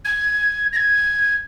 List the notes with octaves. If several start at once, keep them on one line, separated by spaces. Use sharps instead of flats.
G#6
A#6
G#6